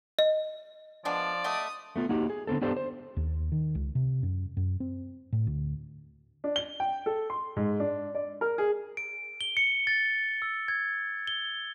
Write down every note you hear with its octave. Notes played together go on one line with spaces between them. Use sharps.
D#5
F3 G#3 B3 D4 D5
F#3 A3 D#5 D#6
A3 B3 F4
A#3 D#4 F#4 G4
G#4
D3 B3 C4 A4
B3 D4 G4 A4 C5
C5
D#2
D#3
C#2
C3
F#2
F#2
C4
A2
D2
D4
G7
G5
A4
C6
G#2
D4
D5
A#4
G#4
D7
G7
C#7
A6
E6
G#6
G7